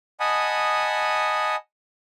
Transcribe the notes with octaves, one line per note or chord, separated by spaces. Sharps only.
D#5 F#5 G#5 A5 B5 D#6